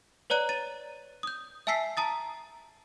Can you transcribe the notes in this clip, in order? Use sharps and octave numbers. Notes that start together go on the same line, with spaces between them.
B4 C#5 D5 A#5 F#6
A6 D#7
D#6 G6
E5 G#5 A5 E6 B6 C7
A5 A#5 D#6 A6